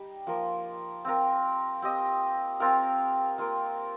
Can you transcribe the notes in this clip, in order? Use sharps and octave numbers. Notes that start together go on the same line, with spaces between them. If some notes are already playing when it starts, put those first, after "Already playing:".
Already playing: G3 D#4 G4
F3 A#3 F4 A#4
C4 F4 A#4
C4 G4 D#5
C4 F4 A#4 F5
A#3 F4 A#4